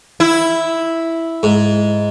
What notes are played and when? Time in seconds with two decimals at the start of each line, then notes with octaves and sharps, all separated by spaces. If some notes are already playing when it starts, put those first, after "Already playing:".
0.20 E4
1.43 G#2